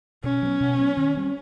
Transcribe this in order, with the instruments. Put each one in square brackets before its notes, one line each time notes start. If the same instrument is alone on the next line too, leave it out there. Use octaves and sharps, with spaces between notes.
[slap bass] B2 [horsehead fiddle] C#4
[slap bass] F#3 B3
B2
F#3 B3
D#3
G3 C4